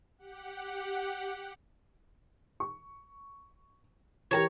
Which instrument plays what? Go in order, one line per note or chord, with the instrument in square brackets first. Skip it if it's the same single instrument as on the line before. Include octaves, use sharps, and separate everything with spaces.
[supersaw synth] G4 F#5
[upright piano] C#6
[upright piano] E3 G4 A#4 [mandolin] C#5 A5 A#5